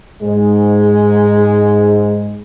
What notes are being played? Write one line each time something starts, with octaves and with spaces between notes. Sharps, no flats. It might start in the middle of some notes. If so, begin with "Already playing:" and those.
G#2 G#3